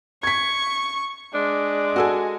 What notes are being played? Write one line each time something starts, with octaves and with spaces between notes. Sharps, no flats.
C#6 G#6 B6
G#3 D4
F#4 A4 G#5